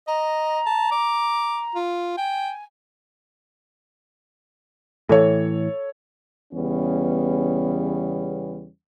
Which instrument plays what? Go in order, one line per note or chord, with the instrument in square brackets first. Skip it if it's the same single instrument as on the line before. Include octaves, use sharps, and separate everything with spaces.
[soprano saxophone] D#5 [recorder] A#5
[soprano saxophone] A5
D6
F4
[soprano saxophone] G5 [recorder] G#5
[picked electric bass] A2 E3 [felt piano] A4 C#5
[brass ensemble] E2 C#3 G3 B3 C#4